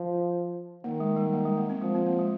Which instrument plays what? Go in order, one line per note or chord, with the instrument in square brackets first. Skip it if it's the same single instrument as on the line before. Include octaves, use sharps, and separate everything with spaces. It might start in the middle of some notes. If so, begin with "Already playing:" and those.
Already playing: [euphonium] F3
[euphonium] D#3 [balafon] A#3
[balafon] G#3
G3
A#3
G#3
A#3
C4
[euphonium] F3 [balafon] G#3
[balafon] C4
A#3
G#3